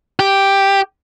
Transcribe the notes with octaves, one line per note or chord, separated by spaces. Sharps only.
G4